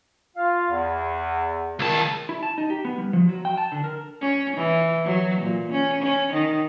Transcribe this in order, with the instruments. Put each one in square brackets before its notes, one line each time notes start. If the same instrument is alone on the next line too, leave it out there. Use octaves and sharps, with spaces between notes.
[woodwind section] F4 F5
E2
[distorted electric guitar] C#2 A5 [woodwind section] D#3
[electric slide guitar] E4
A5
D#4
G4
B3
G3
F3
F#3
G5
A5
D3
A#4
[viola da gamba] C#4
E3
F#3
A#2
C#4
C#4
D#3